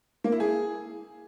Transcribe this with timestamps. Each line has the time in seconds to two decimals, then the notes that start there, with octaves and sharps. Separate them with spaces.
0.24 A#3
0.32 E4
0.40 G#4